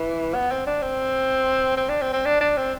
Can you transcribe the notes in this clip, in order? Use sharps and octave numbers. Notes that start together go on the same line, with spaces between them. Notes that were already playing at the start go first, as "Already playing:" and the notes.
Already playing: E3
B3
C4
D4
C4
C4
D4
C4
C4
D4
D4
C4